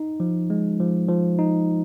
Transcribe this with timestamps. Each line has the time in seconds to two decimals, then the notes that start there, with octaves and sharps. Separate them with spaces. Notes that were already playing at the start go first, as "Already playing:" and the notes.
Already playing: D#4
0.20 F3
0.50 G#3
0.80 F3
1.09 F3
1.39 D#4